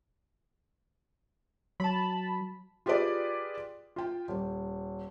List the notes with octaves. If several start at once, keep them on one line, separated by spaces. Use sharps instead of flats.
F#3 A5 B5
F4 G4 G#4 B4 D5
F4 G5
D#1